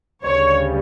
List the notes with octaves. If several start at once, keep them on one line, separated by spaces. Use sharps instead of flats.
D2 C#3 G3 C#5